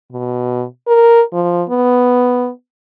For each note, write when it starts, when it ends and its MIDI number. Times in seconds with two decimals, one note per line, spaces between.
0.12 0.65 47
0.87 1.22 70
1.33 1.63 53
1.69 2.50 59